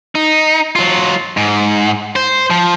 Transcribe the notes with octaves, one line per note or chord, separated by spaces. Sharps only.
D#4
F#3 F4
G#2
C5
F3